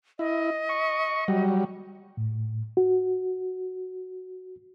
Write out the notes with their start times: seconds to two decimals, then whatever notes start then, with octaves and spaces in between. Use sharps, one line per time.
0.19 E4 D#5
0.69 C#6
1.28 F#3 G3
2.17 A2
2.77 F#4